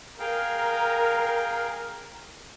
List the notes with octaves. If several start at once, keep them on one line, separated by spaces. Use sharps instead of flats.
G#4 A#4 F5 G5